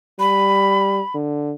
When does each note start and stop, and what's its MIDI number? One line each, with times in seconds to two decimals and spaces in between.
0.20 1.00 55
0.20 1.15 83
1.15 1.53 50